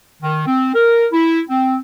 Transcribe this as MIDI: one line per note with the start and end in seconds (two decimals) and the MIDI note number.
0.23 0.47 51
0.47 0.71 60
0.74 1.07 70
1.13 1.41 64
1.49 1.77 60